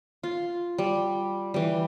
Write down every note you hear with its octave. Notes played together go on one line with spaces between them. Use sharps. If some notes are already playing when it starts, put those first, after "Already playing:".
F4
G3
E3 G3